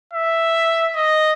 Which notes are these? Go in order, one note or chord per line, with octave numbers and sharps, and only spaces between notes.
E5
D#5